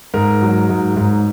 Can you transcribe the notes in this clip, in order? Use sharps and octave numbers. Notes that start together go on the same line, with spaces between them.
G#2 A#4
F#3
G#2
G#2